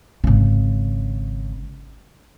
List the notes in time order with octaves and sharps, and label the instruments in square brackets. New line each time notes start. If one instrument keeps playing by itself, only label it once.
[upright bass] G#1 C#3